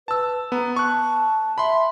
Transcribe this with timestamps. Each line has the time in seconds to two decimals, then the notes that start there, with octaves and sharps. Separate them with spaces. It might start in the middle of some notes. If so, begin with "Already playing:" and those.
0.08 B4 A5 E6
0.52 B3 A#5
0.76 A5 C#6 F#6
1.58 E5 B5 C6